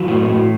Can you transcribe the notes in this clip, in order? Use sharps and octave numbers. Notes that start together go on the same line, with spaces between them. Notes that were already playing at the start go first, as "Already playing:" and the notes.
Already playing: E3 F#3
A2
A2